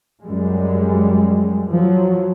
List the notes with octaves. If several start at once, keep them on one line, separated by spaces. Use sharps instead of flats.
F#2 G3 G#3
F3 F#3